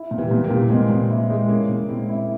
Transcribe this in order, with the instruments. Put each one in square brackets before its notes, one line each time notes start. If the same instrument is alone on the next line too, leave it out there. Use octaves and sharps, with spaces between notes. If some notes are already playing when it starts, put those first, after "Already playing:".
Already playing: [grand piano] E4
A#2
[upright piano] E3 G3
[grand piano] A#2
[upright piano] G3 A#3
[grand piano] A#2
[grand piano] A#2 [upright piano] G#3 C4
[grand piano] A#2
E4
G#3
[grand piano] A#2 [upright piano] A#3 C#4
[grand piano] A#2
[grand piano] G#3 [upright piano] C4 E4
[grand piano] E4